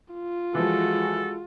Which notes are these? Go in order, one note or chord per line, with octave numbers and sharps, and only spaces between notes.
F4
E3 F3 G#3 F#4 A4